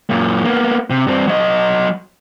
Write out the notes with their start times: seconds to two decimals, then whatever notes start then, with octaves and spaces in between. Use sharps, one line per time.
0.10 F#2 A#2
0.44 A#3 B3
0.90 C3
1.07 G2 C4
1.27 F#3 D#5